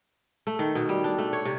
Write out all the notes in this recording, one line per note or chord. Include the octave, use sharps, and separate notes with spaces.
A3
D#3
B2
G3
D4
A3
C#5
C3